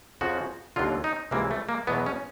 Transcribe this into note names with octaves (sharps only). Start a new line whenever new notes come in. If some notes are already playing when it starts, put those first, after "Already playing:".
F2 C#3 F3 F#4
D#2 D3 F#3 F4
D#4
C#2 C3 E3 A#3
A3
A#3
E2 B2 F#3 B3
C#4